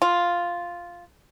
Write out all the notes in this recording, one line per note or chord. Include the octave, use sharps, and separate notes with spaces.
F4